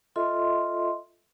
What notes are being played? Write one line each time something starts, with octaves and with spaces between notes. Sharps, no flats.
F4 A4 D#5 E5 C6